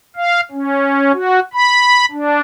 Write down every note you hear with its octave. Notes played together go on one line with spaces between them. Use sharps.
F5
C#4
F#4
B5
D4